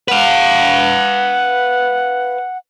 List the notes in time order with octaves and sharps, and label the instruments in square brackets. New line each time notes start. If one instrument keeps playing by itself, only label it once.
[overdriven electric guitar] B4 F5 [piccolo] F#5